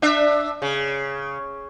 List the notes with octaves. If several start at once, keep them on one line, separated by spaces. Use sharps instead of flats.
D4 E5
C#3